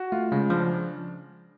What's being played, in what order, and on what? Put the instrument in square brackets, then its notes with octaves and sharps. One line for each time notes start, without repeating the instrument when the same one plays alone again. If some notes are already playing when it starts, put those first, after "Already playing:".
Already playing: [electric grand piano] F#4
[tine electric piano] A3 [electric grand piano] F4
[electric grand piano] C#3 [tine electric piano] G#3
[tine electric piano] F3 [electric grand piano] D4